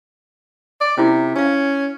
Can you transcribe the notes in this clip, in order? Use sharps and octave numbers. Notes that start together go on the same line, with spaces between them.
D5
C3 C#4 E4 F4
C#4 F5 G#5